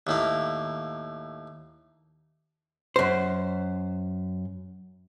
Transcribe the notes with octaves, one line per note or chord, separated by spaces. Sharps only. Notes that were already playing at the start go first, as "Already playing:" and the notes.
D#2 A2 A#3
F#2 C5